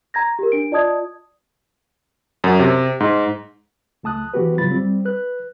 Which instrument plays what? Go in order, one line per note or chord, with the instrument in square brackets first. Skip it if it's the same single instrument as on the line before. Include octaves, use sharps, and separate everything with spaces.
[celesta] A#5 G#6 A#6
G4 A#4
D4 D7
F4 D5 D#5 A5 D#6 G#6
[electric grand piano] F#2
C3
G#2
[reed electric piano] C#2 A3 A5 D#6 F#6
E3 F3 B3 F#4 G4 B4
G#2 C#3 F#3 F4 B5 A6
G3 C4
B4 F#6